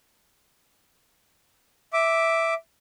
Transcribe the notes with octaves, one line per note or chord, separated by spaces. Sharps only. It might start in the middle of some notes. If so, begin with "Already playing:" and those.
E5 D6